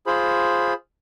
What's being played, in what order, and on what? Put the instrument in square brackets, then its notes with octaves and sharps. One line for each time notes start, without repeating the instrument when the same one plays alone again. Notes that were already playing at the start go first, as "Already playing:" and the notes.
[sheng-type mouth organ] F4 G#4 C5 B5